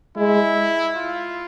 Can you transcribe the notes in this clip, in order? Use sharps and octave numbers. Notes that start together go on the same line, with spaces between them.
G#3 E4
F4